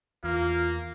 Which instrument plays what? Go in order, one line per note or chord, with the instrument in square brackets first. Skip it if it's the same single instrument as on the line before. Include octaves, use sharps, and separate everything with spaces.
[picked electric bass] E2 [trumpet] A#3 [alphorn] F4 [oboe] F5